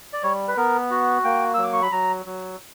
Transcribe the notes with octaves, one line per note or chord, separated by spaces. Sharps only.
D5
G3 C#5
B4
B3 A#4
F#4
A#3 G5
F#3 E6
D6
C#6
B5
F#3 A#5
F#3